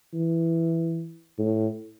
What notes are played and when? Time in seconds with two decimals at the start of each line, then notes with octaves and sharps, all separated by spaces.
0.14 E3
1.38 A2